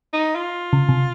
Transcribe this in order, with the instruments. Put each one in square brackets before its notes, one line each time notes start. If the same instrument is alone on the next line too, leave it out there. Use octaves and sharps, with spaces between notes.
[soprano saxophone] D#4
F4
[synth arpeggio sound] C#3
C3